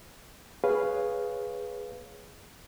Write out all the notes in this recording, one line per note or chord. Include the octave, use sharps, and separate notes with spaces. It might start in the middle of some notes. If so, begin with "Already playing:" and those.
G#4 B4 C#5 F5